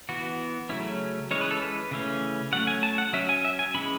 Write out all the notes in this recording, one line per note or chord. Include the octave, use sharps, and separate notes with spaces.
E3 B3 F#4
C#3 F#3 A3 C#4 E4
E3 G#3 C#4 C#5
B4
A4
B4
C#3 E3 A3 C#4
F#3 A3 C#4 F#5
G#5
A5
F#5
F#3 C#4 E5
G#5
E5
G#5
C#3 E3 G#3 C#4 B5